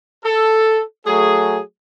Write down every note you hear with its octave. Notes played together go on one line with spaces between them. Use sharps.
A4
F#3 A3 G#4